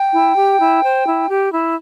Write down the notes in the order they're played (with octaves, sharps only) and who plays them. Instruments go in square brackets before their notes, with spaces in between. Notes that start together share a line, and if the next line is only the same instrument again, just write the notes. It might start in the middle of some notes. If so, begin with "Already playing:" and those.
Already playing: [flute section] G5
E4
G4
E4
C5
E4
G4
E4